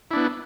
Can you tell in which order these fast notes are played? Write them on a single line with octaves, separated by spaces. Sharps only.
E4 D4 B3